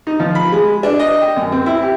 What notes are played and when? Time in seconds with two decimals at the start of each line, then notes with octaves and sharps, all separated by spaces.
0.07 D#4
0.20 F3
0.35 B5
0.52 G#3
0.83 D4
0.99 D#5
1.21 G5
1.36 F#2
1.52 C4
1.66 E4
1.82 G4